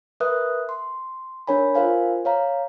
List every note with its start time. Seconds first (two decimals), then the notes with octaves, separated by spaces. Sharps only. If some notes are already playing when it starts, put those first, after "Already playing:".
0.20 A#4 B4 E5 D#6 F#6
0.69 C6
1.47 D4 A#4 C#5 G#5 B5
1.75 F4 A#4 C5 F5 G#5
2.25 C#5 F5 A#5